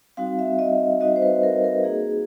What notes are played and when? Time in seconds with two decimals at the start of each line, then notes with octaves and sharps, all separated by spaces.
0.17 G3 C4 D#4 F#4 F5
0.39 E5
0.59 D#5
1.01 G3 C4 D#4 F#4 D#5
1.16 C5
1.22 B4
1.43 A#4
1.64 A#4
1.84 A#3 D#4 F#4 G#4